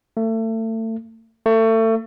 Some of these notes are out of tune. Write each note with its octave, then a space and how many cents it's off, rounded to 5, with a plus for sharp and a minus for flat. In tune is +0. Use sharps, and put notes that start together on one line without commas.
A3 +30
A3 +30